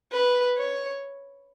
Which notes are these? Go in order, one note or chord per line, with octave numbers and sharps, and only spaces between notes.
B4
C#5